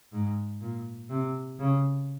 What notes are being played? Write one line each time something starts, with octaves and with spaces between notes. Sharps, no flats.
G#2
A#2
C3
C#3